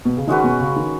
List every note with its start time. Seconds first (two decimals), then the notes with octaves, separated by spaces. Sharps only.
0.05 B2
0.17 C#3
0.27 D#3 G#3 C#4 F#4 B4
0.44 B2
0.60 C#3
0.76 D#3